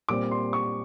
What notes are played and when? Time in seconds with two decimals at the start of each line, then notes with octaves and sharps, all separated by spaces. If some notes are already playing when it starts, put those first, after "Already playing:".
0.09 A#2 G3 C4 D6
0.31 C6
0.53 C#6